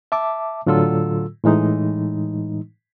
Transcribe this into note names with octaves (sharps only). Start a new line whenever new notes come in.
E5 A5 D6
A2 D3 F#3 F4 A4 E6
A2 E3 G#3 D#4